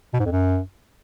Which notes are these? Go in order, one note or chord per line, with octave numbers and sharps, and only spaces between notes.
B2
G#2
F2
F#2